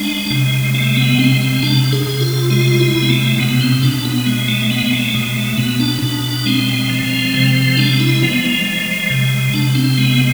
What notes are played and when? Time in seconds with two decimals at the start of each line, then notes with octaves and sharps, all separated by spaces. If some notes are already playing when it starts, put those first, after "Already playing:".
Already playing: G#3 D4
0.30 C3 G#3
0.74 G#3 A3
0.97 B3
1.18 C3 C4
1.41 C4
1.63 C3 D4
1.93 G#4
2.07 C3
2.21 F4
2.50 G#3 F4
2.80 E4
2.95 C3
3.02 B3
3.10 A3
3.39 B2 B3
3.61 C4
3.82 B2 D4
4.05 B3
4.26 G#3
4.48 A3
4.70 G#3 B3
4.92 A3
5.14 B2 G#3
5.36 A3
5.58 B2 B3
5.80 D4
6.02 B2 D4
6.45 G#3 C4
6.90 F3
7.34 C3
7.77 G#3 D4
8.00 E4
8.22 F3 B3
8.65 G#3
9.10 C3
9.54 C3 D4
9.75 C4
9.98 G#3 B3